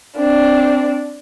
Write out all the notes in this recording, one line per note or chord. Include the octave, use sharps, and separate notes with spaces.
C4 D4